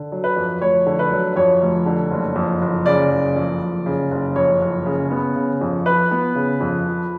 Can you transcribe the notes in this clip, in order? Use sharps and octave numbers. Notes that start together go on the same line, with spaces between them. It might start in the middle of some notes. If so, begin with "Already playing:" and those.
Already playing: D3
F#3
B4
F2
F1 C#5
D3
B4
F#3
F2 C#5
F1
D3
F#1
F2
F#1
C#3 D5
F#1
F2
F#1
C#3
F#1
F2 C#5
F#1
C#3
B3
C#3
F2
F3 B4
B3
C#3
F2
F3